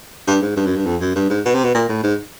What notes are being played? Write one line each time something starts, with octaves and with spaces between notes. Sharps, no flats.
G2
G#2
G2
F#2
G2
F2
F#2
G2
G#2
B2
C3
B2
A#2
A2
G#2